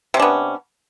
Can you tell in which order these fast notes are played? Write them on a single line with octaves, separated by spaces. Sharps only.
C3 C#4 D4 B3